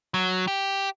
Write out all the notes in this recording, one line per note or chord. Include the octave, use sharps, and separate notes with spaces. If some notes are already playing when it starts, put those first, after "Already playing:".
F#3
G4